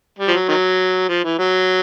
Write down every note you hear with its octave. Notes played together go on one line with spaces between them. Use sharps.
G3
F3
F#3
D#3 F#3
F3
E3
F#3